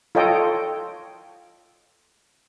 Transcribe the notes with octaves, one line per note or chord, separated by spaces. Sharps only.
F4 A4 C#5 D#5 G5